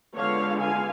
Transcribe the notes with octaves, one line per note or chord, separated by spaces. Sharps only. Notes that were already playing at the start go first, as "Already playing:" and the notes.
D3 G#3 B3 F4 C#5 F5
F5 G#5